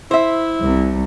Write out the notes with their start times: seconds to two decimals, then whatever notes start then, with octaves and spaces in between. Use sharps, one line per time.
0.11 E4 C5 E5
0.62 C2